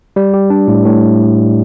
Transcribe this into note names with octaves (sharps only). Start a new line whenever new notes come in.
G3
G4
D4
A2
A2